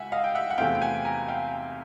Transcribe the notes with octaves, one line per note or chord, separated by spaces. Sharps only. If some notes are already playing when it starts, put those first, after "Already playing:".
Already playing: C#2 E5 F#5 G#5
D#5 F5
G5
E5 F#5
F#5
E2 C3 E3 A3 C4 F5 G5
G5
F#5 G#5
G#5 A#5
F5 G5